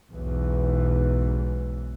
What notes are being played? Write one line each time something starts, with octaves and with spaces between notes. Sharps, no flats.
B1 E2 G#2 E3